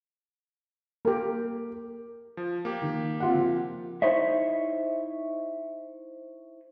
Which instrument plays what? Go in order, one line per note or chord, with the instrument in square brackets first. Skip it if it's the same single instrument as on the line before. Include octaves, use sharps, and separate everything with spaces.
[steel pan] A#3 G4 [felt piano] A#4
[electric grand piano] F3
A#3 G4
[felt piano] D#3
C4 F4 F#5
F3
[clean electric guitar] D#4 E4 C5 C#5 D#5 E5